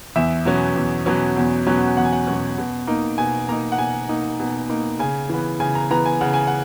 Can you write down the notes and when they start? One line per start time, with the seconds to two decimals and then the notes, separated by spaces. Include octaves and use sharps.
0.16 E2 E5
0.45 B2 F#3 C#4
0.76 E2
1.06 B2 F#3 C#4
1.37 E2
1.67 B2 F#3 C#4
1.97 E2 F#5
2.05 G#5
2.13 F#5
2.27 B2 F#3 C#4
2.58 B2
2.87 A#3 D#4
3.18 B2 G#5
3.49 A#3 D#4 A#5
3.72 F#5
3.78 B2 G#5
4.09 A#3 D#4
4.39 B2
4.70 A#3 D#4
4.99 C#3 G#5
5.29 E3 B3
5.60 C#3 G#5
5.75 A#5
5.90 E3 B3 A#5
6.06 G#5
6.21 C#3 F#5
6.34 G#5
6.47 F#5